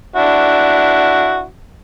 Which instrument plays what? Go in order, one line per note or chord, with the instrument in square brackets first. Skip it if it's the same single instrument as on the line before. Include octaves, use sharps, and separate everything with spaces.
[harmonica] D4 E4 F#4